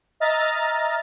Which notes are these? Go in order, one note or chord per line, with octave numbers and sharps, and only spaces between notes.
D#5 E5 A#5 F6 A6